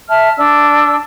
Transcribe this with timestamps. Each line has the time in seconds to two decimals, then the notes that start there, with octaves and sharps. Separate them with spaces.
0.09 E5 A5 F6
0.37 D4 E6